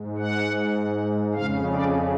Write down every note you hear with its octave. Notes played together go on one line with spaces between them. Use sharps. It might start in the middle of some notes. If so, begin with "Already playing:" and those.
Already playing: G#2
F#5
F2 C#3 F5
D5